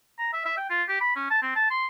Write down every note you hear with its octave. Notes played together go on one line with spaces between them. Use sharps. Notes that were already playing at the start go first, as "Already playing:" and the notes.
A#5
E5
E5
G5
F4
G4
B5
C#4
A5
C4
A5
C6